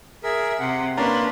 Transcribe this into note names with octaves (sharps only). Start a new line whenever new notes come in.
G#4 A#4 E5
C3 F#5
A#3 C#4 D4 B4 A5 A#5 C6